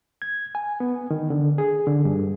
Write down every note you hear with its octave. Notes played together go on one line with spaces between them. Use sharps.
G#6
G#5
B3
D#3
D3
G#4
D3
G2